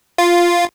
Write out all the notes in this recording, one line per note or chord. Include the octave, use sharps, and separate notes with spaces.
F4